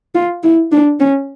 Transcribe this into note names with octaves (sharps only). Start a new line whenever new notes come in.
F4
E4
D4
C#4